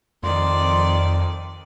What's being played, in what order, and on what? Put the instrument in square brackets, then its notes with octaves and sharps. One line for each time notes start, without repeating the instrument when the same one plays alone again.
[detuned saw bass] F2 [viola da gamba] D#3 D5 [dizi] C6